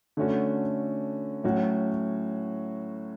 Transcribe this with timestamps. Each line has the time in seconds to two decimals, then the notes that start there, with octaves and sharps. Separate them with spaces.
0.17 D3 A3 C#4 F#4
1.44 A2 F#3 C#4 F#4